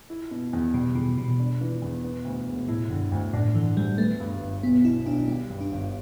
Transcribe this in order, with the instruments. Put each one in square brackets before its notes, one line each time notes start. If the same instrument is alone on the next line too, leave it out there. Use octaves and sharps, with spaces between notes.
[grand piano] E4
B2
E2
[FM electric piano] B2 [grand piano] G3
[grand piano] E2 [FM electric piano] B2
[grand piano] E1 [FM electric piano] B2
[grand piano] D4
E3
E2
B3
D2
E1
[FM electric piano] A2 [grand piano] E4
[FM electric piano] G2 [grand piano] D3
[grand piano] D2 [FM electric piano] G2
[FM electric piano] A2 [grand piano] D4
[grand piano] D3 [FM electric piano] E3
[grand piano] D2 [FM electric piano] G3
[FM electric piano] A3 [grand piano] B3
[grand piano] G2
G1
[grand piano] B1 [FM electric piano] B3
[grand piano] B2 [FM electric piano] E4
[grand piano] B1 [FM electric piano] D4
[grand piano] G3 [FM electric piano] B3
[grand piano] G2
[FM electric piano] D4
[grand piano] G1